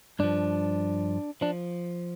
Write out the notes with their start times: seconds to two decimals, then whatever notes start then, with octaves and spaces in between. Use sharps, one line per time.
0.19 G2 F3 D4
1.41 F3 D4